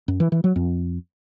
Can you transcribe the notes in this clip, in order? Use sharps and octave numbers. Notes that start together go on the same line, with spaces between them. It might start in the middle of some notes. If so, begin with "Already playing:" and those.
F#2
E3
E3
F#3
F2